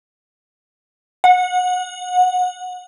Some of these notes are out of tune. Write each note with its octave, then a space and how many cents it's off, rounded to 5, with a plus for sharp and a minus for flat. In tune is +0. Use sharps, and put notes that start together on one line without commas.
F#5 -25